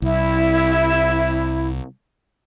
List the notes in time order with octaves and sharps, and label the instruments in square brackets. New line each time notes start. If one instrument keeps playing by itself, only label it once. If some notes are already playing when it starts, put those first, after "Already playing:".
[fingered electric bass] C2 [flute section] E4